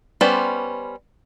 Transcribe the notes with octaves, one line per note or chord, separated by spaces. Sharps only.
G3 B3 C#4 C5 D5